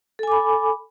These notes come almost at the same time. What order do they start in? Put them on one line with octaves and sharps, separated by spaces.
A4 G#5 D6 B5